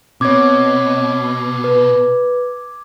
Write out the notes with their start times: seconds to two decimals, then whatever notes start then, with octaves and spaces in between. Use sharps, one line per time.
0.21 B2 C4 C#5 D6 G#6
1.64 B4